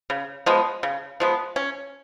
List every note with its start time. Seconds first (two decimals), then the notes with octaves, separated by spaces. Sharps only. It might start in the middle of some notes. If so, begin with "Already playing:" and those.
0.10 C#3
0.46 F3 G#3 B3
0.83 C#3
1.20 F3 G#3 B3
1.56 C#4